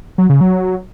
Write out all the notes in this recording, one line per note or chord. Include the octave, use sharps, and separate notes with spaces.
F#3
C#3
F#3